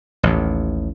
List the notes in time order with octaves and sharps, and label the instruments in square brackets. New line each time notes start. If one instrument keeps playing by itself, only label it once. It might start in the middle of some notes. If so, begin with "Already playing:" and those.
[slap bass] A1 D#2